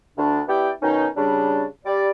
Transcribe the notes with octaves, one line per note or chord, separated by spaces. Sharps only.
D2 D4
B3 E4 G4 D5 G5
B2 D#3 C#4 D#4
C#3 G3 D4
G3 D5